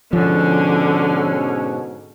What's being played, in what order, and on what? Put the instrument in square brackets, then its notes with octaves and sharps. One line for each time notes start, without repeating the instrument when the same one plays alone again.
[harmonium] G#2 B2 [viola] D3 [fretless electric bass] F3 [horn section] C#4